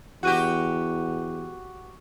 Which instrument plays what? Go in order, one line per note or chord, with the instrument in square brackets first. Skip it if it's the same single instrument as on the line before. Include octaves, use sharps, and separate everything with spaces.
[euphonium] E2 [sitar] F#4 G4 [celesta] F#5 F#6 D#7